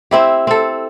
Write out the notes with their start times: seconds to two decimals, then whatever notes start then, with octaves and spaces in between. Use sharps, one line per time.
0.11 C4 E4 G4
0.47 C4 A4